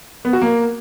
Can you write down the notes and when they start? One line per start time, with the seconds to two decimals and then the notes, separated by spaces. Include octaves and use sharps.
0.25 B3
0.33 F#4
0.42 A#3